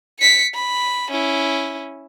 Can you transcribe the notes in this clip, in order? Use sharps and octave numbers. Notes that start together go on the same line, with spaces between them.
B6 C#7
B5
C#4 E4